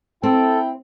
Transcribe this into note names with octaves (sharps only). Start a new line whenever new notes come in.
C4 E4 A4 G5